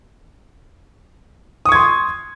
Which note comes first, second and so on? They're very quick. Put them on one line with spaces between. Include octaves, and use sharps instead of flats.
D#6 C#6 G#6 C6